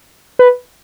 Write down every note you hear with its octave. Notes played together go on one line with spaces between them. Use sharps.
B4